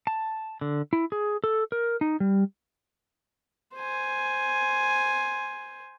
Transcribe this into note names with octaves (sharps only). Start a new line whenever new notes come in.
A5
D3
E4
G#4
A4
A#4
D#4
G3
C5 G#5